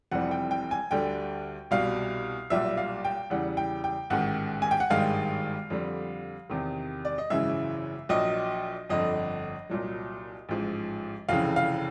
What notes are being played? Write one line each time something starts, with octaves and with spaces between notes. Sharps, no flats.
F1 F2 C3 E3 G3 F#5
G5
G5
G#5
D2 D3 G3 G5
C2 B2 G3 F5
B1 A#2 G3 E5
F5
G5
E2 C#3 E3 G3 F#5
G5
G5
A1 G#2 D#3 F#5
G#5
G5
F#5
G#1 G2 D#3 G#3 F5
F2 D3 G3
E2 C3 D#3
D5
D#5
G#1 F#2 C#3 E3 E5
A#1 A#2 F#3 D#5
G1 F2 D3 D#5
C2 A#2 F#3
A1 G#2 F3
F1 F2 C#3 E3 F5
F5